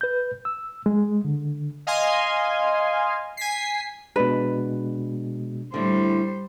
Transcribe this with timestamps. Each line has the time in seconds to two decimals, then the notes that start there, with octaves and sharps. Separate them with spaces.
0.01 B4 G6
0.45 E6
0.86 G#3
1.24 D3
1.87 D#5 F5 G#5 C6
3.37 G#5 B6 C7
4.16 B2 G#3 D4 B4
5.74 A2 D3 G3 C5